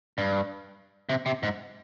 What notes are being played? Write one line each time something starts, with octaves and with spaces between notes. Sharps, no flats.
G2
C3
C3
G#2